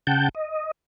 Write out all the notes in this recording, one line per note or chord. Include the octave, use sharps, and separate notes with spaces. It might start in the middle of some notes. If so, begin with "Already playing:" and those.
C#3 F#5 G5 A5 G6
D#5